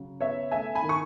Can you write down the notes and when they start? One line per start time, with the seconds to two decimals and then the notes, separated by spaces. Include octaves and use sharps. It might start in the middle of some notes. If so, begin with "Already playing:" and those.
Already playing: C#3 F#3
0.21 B3 C#5 E5
0.51 A3 E5 G#5
0.75 G#5 B5
0.82 D#3
0.89 C#6